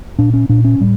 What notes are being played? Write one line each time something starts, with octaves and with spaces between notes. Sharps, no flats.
A#2 D4
C#4
A#2 D4
C#4
A2 G3